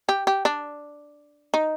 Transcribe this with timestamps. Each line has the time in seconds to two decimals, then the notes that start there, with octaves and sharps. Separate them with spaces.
0.09 G4
0.27 G4
0.45 D4
1.54 D#4